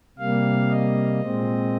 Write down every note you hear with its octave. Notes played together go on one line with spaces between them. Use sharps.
C3 G3 A#3 F5
D#5
A#2 G#3 C4